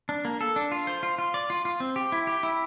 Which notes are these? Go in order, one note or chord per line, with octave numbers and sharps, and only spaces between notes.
D4
A#3
A4
D4
F4
C5
F4
F4
D5
F4
F4
C4
G4
E4
G4
E4